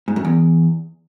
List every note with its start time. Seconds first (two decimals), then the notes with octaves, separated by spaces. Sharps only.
0.08 G#2
0.16 F#2
0.25 E2